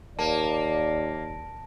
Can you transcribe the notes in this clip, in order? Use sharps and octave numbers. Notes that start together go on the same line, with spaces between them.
D#2 A#3 D5 A5